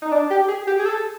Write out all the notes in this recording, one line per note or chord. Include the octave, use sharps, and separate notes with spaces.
D#4
D4
G4
G#4
G4
G#4
A4